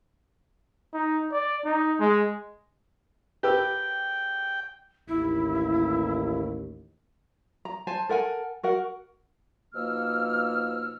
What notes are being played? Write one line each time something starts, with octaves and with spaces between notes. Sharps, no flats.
D#4
D5
D#4
G#3
G4 B4 G5 E6
A1 D#2 E4
A#5
C5 G#5 A5
A4 A#4 F#5 G#5
F#4 A#4 F#5
B2 F3 A#3 D#4 E6 F6